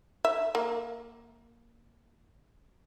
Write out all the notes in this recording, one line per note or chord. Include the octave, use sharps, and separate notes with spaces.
E5
A#3